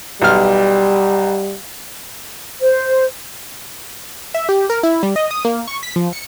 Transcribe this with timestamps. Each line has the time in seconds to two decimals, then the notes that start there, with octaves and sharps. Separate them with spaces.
0.22 B1 G3 F6
2.61 C5
4.34 E5
4.49 G4
4.70 A#4
4.83 E4
5.03 G3
5.16 D#5
5.31 D#6
5.45 A#3
5.68 C#6
5.83 B6
5.96 F3
6.13 C#7